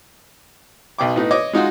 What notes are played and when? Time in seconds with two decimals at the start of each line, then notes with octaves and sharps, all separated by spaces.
0.99 B1 B2 G5 D6
1.16 A2 B3 D#4
1.31 C#5 D#5 D6 D#6
1.53 G#3 D#4 F4 F#4